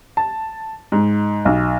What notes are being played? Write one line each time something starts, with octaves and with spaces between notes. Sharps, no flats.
A5
G#2
B1